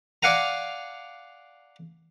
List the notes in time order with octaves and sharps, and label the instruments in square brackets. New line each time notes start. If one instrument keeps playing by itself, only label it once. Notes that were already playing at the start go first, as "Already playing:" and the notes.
[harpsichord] D5 F5 F#5 G#5 A#5